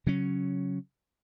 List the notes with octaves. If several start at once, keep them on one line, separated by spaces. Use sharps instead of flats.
C#3 F#3 C#4